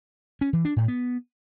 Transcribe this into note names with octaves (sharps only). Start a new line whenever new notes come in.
C#4
E3
D4
A2
B3